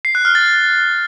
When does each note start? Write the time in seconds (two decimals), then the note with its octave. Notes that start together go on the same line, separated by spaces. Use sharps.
0.05 C7
0.15 F#6
0.25 F6
0.35 A6